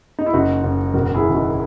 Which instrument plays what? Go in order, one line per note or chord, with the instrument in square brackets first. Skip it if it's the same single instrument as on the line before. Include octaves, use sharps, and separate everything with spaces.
[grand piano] D#4
E4
F#1 D#4 F#4
F#1
E1 F#4 A#4
E4 G#4
D#3
D#4 F#4